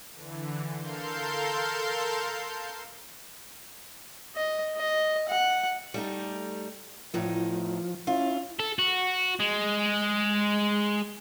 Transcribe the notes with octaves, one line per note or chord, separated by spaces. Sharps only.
D3 E3
A4 A#4 F5 C6 G6
D#5
D#5
F#5
G3 A3 D#4
E2 A2 F3 D#4
C#4 E4 F4
A4
F#4
G#3